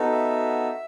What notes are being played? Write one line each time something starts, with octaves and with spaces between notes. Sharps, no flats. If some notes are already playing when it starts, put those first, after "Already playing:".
Already playing: B3 D#4 F#4 A4
E5